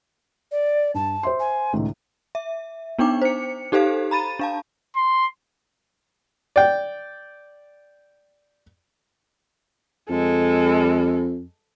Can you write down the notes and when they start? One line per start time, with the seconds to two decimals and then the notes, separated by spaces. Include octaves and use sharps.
0.51 D5
0.94 G2 A5
1.23 C5 E5 C6
1.39 G#5
1.73 C#2 A2 D#3
2.35 E5
2.99 B3 D4 D#4 G5 D6
3.22 C5 C#7
3.72 D#4 G4 A4 C5 F5
4.11 A#5 B5 A6 D#7
4.39 D4 F5 A5
4.96 C6
6.56 D5 G5
10.09 F2 G#3 A4